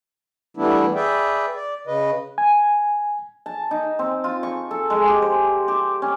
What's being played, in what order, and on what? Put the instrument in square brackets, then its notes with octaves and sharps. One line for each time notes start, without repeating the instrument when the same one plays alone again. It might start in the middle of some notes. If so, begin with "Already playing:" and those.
[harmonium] E3 G3 A3 B3 D4 E4
G#4 B4 D5 E5 G5
D5
C#3 B4 D#5
[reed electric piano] G#5
[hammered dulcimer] A5
D#4
C4
F4
C#6
A4
G#3
G4
C5
G4
C#4